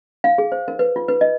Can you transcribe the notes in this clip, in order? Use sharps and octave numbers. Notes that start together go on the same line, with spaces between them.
F5
G#4
C5
A#4
B4
F4
B4
D#5